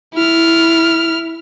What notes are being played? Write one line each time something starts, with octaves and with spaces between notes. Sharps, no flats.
E4 F6